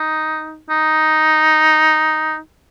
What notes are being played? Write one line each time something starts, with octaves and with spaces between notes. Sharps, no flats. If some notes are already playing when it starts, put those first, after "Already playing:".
Already playing: D#4
D#4